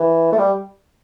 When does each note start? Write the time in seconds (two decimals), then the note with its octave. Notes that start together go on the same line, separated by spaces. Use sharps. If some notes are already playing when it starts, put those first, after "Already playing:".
Already playing: E3
0.32 A3
0.38 G3